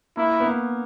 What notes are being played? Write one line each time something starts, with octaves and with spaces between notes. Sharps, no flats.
A#3 E4
B3
A#3